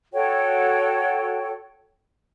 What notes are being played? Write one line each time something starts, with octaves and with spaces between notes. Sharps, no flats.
F#4 A4 C#5 G5